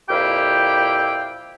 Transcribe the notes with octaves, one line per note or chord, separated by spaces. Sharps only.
F2 A#2 E4 G4 F5 G5